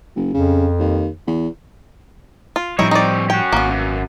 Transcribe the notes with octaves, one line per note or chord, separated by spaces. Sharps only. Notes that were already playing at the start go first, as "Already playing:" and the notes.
F#1
F2 C#3
D#2
E2
F4
A2 F3 G3 C4 D#4 E4 C#5
D#4 D5
C#4 F#4 G5
G#1 A#3 B3
F#2